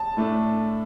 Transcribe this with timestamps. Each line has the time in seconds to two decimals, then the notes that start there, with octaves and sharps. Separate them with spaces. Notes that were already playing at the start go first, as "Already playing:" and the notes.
Already playing: A5
0.17 A2 A3 D4